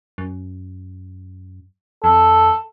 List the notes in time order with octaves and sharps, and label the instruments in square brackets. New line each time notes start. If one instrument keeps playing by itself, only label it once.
[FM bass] F#2
[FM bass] F2 [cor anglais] A4